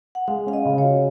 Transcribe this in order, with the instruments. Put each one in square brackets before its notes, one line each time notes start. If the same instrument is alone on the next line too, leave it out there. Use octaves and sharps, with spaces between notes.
[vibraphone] F#5
[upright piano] G#3 [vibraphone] F5
[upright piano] C#4 [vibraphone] F5
[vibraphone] D#5
[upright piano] C#3
[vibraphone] C#5
[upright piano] F#4